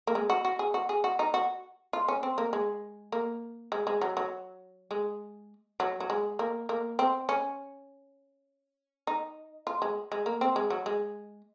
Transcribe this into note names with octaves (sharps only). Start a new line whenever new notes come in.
A#3
G#3
F#4
F#4
G#4
F#4
G#4
F#4
D#4
F#4
F4
C#4
C4
A#3
G#3
A#3
G#3
G#3
F#3
F#3
G#3
F#3
F#3
G#3
A#3
A#3
C4
C#4
D#4
F4
G#3
G#3
A#3
C4
G#3
F#3
G#3